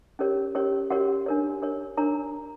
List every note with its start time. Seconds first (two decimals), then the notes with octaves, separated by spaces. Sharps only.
0.19 C#4 G4 A#4 C#5
0.55 C#4 G4 A#4 C#5
0.90 C#4 F#4 G4 A#4 C#5 F#5
1.26 D4 A#4 C#5
1.62 D4 A#4 C#5
1.97 D4 A#4 C#5 A#5